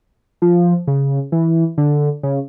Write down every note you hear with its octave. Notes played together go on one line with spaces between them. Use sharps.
F3
C#3
E3
D3
C#3